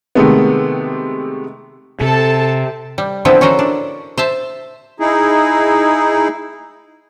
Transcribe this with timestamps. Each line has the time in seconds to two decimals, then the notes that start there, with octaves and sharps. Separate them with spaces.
0.15 C3 D#3 G#3 A3 B3
2.01 C3 A4 A5
2.98 G3
3.25 D3 F3 B3 C4 E4
3.41 C#4 F#4 A4 A#4 C5
3.59 D4
4.18 C5 E5 A5
5.00 D#4 E4 G#4